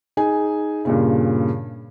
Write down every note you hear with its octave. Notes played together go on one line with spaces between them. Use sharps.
D#4 G#4 G#5
G2 A#2 C#3